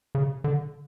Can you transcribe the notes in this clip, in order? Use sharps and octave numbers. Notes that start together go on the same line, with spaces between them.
C#3
D3